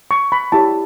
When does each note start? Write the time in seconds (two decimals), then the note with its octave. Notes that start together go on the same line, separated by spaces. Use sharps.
0.11 C#6
0.32 B5
0.52 E4 G4 C#5 A5